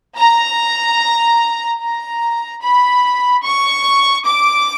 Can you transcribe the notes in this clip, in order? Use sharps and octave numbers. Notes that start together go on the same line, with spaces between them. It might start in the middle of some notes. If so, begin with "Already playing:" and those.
A#5
A#5
B5
C#6
D6